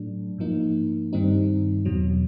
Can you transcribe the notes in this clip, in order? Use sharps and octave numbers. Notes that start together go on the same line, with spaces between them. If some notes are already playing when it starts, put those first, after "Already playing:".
Already playing: A2 F#3 A3 D4
G#2 F3 A#3 D#4
G2 D#3 G3 C4 D#4
E2 B2 F#3